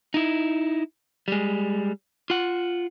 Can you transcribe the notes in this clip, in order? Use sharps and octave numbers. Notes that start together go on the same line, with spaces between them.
D#4 E4
G3 G#3
F4 F#5